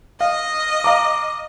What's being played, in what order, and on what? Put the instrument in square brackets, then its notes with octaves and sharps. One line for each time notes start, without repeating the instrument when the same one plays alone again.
[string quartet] D#5 [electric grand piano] F5
[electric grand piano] F5 A#5 D6